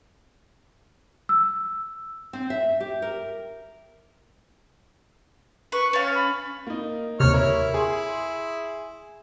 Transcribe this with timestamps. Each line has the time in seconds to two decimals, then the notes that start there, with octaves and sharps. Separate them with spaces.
1.29 E6
2.33 C4
2.50 E5
2.80 G4
3.02 A#4
5.72 B4 C#6
5.93 C#4 F5 A6
6.14 B5
6.67 A#3 D#4
7.20 D#2 C3 C#5 F6
7.34 E4 A#4 C#5
7.74 G#4 C6